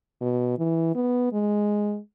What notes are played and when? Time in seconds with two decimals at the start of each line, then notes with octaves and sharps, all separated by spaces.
0.21 B2
0.59 E3
0.95 B3
1.33 G#3